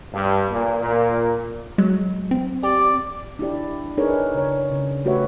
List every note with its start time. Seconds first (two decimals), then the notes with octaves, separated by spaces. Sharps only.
0.13 G2
0.51 A#2
0.82 A#2
1.78 F#3 G#3
2.31 C4
2.63 G4 D5
3.39 D4 E4 G4 D5
3.97 D4 D#4 G#4 A#4 B4 C#5
4.34 C#3 C#5
4.72 C#3
5.05 A3 F#4 G4 B4 C#5 E5